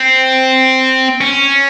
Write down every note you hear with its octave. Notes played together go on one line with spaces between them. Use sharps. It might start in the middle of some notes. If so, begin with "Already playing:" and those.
Already playing: C4
C#4